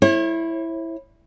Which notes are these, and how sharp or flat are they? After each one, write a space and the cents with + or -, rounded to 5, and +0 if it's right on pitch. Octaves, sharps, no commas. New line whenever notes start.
E4 +0 C#5 -45